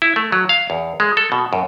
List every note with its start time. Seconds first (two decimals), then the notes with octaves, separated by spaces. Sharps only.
0.02 E4
0.16 A3
0.32 F#3
0.49 F5
0.70 E2
1.00 G#3
1.17 A4
1.32 B2
1.53 F#2